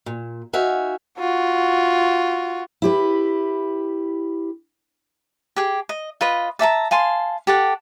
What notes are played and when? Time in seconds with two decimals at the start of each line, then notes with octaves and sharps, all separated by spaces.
0.06 A#2
0.53 D#4 F#4 E5 F5 G#5
1.18 F4 F#4
2.82 E4 G4 B4
5.56 G4 G#4
5.89 D#5
6.21 F4 B4 D#5
6.59 D5 E5 A5 A#5
6.91 F5 G#5 A5 C6
7.47 G4 A4 F#5